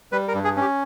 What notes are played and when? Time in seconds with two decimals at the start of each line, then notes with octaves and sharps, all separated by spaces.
0.12 G3 B4
0.28 A#4
0.34 G2
0.44 G#4
0.57 C#4 G4